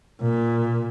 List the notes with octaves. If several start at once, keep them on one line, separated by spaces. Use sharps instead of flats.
A#2